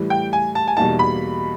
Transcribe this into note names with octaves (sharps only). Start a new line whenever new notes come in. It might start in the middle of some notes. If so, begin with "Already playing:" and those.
Already playing: A2 E3 G3
G5
G#5
A5
G#5
E2 B2 G3 A#3 D#4 A5
B5